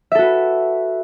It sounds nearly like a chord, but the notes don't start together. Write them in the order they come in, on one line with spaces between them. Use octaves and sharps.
E5 A4 F#4 B4